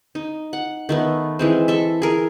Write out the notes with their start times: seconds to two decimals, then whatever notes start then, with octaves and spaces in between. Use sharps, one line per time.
0.15 D#4
0.53 F#5
0.89 D#3 A3 B3
1.39 E3 G#3 C4
1.68 A4 E5
2.02 G#4 A#4